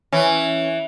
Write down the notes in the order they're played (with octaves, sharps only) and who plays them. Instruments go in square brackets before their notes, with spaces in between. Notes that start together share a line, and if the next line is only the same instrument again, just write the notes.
[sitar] E3 [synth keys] C#4